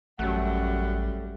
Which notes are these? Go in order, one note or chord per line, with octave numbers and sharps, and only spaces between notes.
A1 F#2 G3 A3 F#5